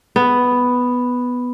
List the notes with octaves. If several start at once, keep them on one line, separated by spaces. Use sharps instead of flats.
B3